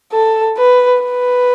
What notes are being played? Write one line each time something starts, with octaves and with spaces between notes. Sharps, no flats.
A4
B4
B4